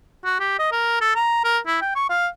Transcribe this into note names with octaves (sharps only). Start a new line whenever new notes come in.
F#4
G4
D#5
A#4
A4
A#5
A#4
E4
G5
C#6
F5